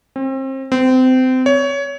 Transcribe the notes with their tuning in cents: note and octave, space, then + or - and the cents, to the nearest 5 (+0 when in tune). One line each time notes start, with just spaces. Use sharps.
C4 +35
C4 -25
C#5 +20